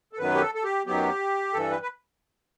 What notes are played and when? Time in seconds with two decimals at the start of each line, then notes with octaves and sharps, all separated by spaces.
0.13 A4
0.19 F#2 D#3 F#3 B3 B4
0.35 G4
0.41 A4
0.55 A4
0.64 G4
0.86 F#2 D#3 F#3 B3 G4
1.54 G2 E3 G3 A4
1.71 B4
1.83 B4